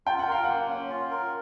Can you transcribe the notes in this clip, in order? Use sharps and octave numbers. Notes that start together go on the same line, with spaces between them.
F4 G5
F#5
A#4 F5
A#3 F#5
C#4
F4
A#4